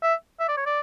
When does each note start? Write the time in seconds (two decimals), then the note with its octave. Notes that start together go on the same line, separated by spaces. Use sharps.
0.03 E5
0.40 E5
0.48 D5
0.57 C#5
0.66 D5